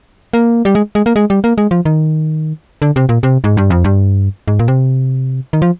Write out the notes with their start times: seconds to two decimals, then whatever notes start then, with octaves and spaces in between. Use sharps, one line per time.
0.33 A#3
0.65 G3
0.75 G#3
0.95 G#3
1.06 A#3
1.16 G#3
1.30 G3
1.44 A#3
1.58 G#3
1.71 F3
1.85 D#3
2.82 D3
2.96 C3
3.09 A#2
3.23 C3
3.44 G#2
3.57 G2
3.70 F2
3.84 G2
4.48 G#2
4.59 A#2
4.68 C3
5.53 D#3
5.62 F3